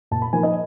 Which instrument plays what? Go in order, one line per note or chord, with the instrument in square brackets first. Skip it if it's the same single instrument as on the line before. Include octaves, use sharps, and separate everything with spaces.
[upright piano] A#2 A5
B5
F3 A#3 D#4 G#5
D#5